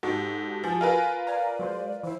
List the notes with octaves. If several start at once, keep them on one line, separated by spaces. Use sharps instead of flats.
G#2 F#4 G4 A4
F3 G#5
F4 A#4 B4
D5 F5 G#5 A#5
F#3 G#3 C5
E3 E4 C5